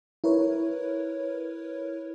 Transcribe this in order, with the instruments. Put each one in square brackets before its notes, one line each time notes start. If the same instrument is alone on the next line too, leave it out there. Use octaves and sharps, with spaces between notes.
[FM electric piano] E4 A#4 B4 C#5